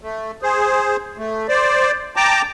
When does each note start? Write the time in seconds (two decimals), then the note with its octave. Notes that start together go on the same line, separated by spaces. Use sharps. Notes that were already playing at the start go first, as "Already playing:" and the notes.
0.01 A3
0.42 G#4 C5
1.17 A3
1.49 C5 D5
2.16 G5 A5 A#5 D6